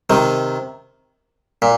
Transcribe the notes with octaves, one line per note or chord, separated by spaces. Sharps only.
C3 D#3
A#2